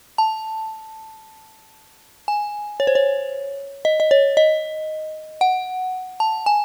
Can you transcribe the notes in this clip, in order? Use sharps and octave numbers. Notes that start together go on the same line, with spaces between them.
A5
G#5
C#5
C5
C#5
D#5
D#5
C#5
D#5
F#5
A5
G#5